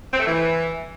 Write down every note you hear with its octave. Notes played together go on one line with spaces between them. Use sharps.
C4
A3
E3